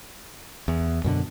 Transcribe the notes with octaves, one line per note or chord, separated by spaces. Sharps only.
E2
F#2 B2 D3